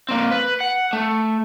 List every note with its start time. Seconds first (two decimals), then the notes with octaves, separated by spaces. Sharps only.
0.09 A#3 C4
0.32 B4
0.60 F#5
0.93 A3